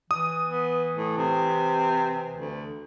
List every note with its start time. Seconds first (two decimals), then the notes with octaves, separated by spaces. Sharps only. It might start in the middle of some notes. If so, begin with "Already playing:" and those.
0.11 E3 D#6
0.48 B3
0.96 A2
1.18 C3
2.35 D2